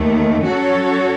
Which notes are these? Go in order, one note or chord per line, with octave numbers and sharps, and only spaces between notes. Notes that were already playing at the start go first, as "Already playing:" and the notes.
Already playing: D#2 D#3 A3
F#3 C#4 F#4 A4 C#5